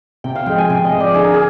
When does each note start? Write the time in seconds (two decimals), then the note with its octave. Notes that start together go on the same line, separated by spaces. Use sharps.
0.24 C3 G5
0.35 F5
0.46 F3 G#3 G5
0.58 G#5
0.70 C3 G5
0.85 D#5
0.92 F3 G#3
1.00 D5
1.14 D3 G#4
1.24 A#4
1.34 G#4